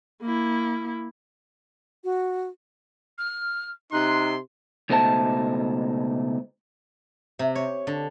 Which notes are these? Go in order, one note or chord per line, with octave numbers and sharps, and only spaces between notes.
A#3 E4
F#4
F6
C3 D#4 C6 F#6
C#2 B2 A3 D#4 C5 A5
C3
C#5
D3